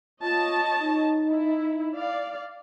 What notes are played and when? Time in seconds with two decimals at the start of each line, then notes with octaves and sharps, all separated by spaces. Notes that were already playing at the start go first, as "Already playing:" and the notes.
0.22 F4 C#5 D#5 A5
0.80 D#4
1.30 E4
1.94 D5 F5